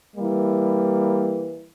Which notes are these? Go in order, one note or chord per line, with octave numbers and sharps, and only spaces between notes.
E3 G3 A#3